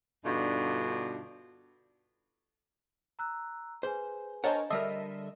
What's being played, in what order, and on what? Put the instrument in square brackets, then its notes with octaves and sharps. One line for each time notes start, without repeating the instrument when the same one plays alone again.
[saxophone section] G2 B2 D3 D4 D#4 F4
[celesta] A#5 E6 F#6
[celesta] G#4 B4 G#5 [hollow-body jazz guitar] C5
[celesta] D4 G#5 [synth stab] A#4 C#5 A5 [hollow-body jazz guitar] C5 D#5 F#5
[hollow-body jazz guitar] D3 G3 A#4 [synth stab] A4 D#5 E5 [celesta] C7